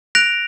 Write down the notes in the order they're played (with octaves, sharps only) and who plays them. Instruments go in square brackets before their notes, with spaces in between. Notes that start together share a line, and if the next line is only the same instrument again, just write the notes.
[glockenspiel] F#6 A#6 D7 F7